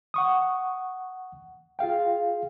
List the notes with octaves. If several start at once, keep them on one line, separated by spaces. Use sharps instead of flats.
F#5 C#6 D#6
F4 G#4 F5 G5